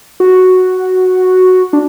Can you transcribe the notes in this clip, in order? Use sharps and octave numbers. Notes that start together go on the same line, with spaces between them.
F#4
D4